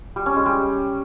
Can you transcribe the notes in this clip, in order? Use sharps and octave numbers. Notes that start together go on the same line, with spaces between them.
G3
C#4
G#3
G3